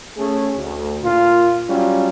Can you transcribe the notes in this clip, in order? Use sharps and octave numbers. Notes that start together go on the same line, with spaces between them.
A3 C#4 G#4
D2
A#2 F4
F#3 G3 C#4 F4